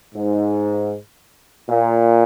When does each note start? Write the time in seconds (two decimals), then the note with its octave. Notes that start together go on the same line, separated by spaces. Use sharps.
0.15 G#2
1.69 A#2